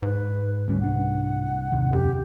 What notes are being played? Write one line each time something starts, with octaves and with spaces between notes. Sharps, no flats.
G#2 B4
D2 G3 C#4
C2 D4 F#5
D#2 C3 D#3
F#2 G4